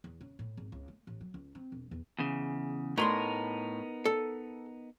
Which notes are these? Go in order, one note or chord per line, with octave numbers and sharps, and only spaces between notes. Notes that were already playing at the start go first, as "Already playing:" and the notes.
E2
C#3
A2
G#1
C#2
A3
A1
F#3
C#2
C4
E1
E2
E2 C#3
A2 B3 D#4 A#4 B5 C6
A4